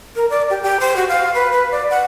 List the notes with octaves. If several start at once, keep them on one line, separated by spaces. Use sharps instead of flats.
A#4
D5
G4
G4
C5
F#4
F5
B4
B4
D5
F#5